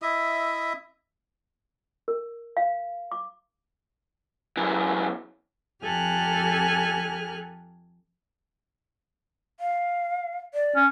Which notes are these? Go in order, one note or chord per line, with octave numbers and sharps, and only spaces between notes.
E4 D#5 E5 D#6
A#4
F5
D6
F#2 E3
F2 G4 A4 G#5 F6 F#6
F5
D5
C#4